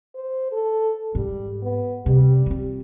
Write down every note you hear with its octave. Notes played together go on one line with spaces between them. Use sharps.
C5
A4
G#2 G3
B3
C3 G3
C4 F4